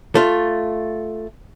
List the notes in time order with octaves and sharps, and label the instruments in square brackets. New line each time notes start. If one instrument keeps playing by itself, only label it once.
[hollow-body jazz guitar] A3 F4